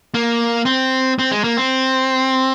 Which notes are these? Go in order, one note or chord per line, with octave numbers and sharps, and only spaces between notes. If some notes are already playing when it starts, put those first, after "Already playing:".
A#3
C4
C4
G#3
A#3
C4